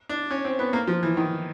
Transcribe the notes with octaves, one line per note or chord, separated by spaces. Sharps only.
D4
C#4
C4
B3
A#3
F3
E3
D#3